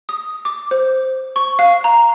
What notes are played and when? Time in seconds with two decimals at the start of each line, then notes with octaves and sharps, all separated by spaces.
0.09 D#6
0.45 D6
0.71 C5
1.36 C#6
1.59 F5
1.84 A#5